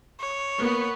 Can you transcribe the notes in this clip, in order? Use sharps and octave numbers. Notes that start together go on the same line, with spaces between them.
C#5
A#3 B3